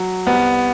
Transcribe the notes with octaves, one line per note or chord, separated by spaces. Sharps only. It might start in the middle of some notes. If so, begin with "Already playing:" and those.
Already playing: F#3
C2 B3